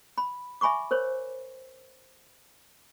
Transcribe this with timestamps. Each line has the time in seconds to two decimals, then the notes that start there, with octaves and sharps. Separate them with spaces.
0.18 B5
0.61 E5 G#5 B5 C#6 D6
0.91 A#4 C5 C#5